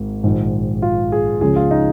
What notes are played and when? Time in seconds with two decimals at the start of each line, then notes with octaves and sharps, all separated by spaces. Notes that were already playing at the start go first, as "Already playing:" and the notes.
Already playing: G#1 G#2
0.23 A#1 G#2 D#3
0.82 F4
1.12 G#4
1.41 C#2 C#3 F3 G#4
1.56 F4
1.71 D#4